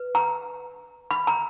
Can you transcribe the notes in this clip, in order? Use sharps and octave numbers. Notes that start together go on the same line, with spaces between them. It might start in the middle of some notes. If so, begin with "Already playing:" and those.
Already playing: B4
A#5
B5
A#5